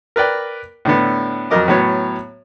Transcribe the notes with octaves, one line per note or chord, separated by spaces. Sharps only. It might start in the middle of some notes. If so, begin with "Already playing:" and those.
A#4 B4 D5 G5
A2 D3 B3
F2 F#3 A#4 D#5 D6
A2 F#3 B3 C#5